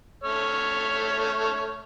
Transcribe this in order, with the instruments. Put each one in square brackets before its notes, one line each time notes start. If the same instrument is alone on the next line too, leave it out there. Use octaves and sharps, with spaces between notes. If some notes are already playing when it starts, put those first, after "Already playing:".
[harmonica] A3 C#5 F6